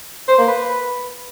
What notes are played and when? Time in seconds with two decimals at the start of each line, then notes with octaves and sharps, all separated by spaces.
0.28 C5
0.38 A#3
0.48 B4